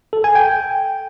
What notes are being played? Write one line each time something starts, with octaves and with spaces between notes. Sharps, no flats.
A4
G#5
G5